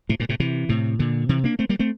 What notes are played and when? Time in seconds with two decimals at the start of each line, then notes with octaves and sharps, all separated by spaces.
0.09 A2 C3
0.20 G2 A#2
0.29 A2 C3
0.40 C3 E3
0.69 A2 C3
0.99 A#2 D3
1.29 C3 E3
1.44 A#3 D4
1.59 A3 C4
1.69 G3 A#3
1.79 A3 C4